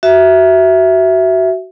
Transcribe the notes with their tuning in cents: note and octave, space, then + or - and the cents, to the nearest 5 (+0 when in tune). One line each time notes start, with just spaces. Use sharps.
F#4 +20 E5 +0